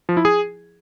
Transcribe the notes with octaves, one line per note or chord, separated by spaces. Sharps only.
F3
E4
G#4